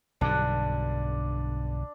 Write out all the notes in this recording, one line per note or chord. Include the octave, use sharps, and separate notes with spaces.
B1 G2 D3 D4